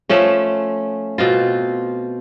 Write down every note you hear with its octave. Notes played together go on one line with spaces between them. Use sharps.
F3 A3 C#4
B2 C4 F4